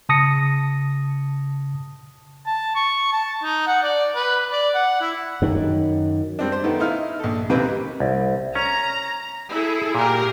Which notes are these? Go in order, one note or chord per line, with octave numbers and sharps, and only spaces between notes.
C#3 A5 D#6 A#6 C#7
A5
C#6
A5
D#4
F#5
D5
B4
D5
F#5
E4
F#2 D#3
G3 C4 D4
C5
D#3 A3 B3
D#4 E4 F5
A#1 A4
D#2 C3 A#3 C4 B4
C2
C#4 A#5
E4 G#4 A4
A#2 G4 G#4 A#4